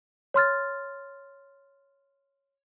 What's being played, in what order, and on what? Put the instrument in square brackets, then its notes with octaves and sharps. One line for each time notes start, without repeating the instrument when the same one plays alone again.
[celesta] C#5 C6 F6 A6